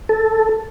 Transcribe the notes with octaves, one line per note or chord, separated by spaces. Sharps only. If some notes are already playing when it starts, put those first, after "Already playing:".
A4